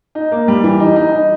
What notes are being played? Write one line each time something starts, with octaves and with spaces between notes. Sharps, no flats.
D#4
A#3
G3
E3
D#4
D#4
D#4